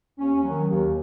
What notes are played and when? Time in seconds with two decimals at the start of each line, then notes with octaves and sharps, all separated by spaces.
0.19 D#2 C#4
0.43 D#3 F#3
0.68 D#2